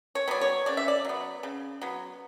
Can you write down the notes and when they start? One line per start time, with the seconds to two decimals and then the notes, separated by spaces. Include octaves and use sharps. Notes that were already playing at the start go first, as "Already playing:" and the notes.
0.15 C#5
0.28 F#3 B3 D5
0.41 C#5
0.66 C#3 D5
0.77 E5
0.88 D5
1.05 F#3 B3
1.43 C#3
1.81 F#3 B3